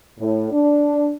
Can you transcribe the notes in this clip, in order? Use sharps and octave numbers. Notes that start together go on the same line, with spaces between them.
A2
D4